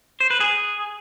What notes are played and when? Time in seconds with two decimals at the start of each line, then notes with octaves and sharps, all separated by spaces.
0.20 C5
0.30 B4
0.40 G#4